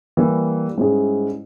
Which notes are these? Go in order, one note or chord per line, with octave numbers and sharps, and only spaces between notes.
E3 G3 A#3
G#2 G3 C#4 E4 G#4